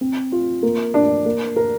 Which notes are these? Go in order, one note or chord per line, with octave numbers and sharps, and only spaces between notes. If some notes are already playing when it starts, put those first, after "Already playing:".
C4
F4
A#3
D4
A#3
A#4